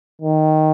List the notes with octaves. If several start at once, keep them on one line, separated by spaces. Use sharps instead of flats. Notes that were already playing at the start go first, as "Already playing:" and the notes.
D#3